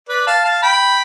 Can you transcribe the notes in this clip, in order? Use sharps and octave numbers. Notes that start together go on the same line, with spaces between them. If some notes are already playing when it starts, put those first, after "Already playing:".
B4 D5
F5 A5
F5 A5
G5 B5